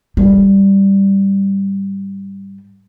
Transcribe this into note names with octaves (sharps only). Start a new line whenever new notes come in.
G#2 G3